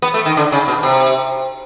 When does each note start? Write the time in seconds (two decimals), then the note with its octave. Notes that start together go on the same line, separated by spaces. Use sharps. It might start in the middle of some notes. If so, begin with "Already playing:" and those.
0.02 B3
0.14 A3
0.25 D#3
0.37 D3
0.52 C#3
0.68 B2
0.83 C3